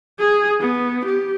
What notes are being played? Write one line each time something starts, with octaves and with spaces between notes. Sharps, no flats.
G#4
B3
G4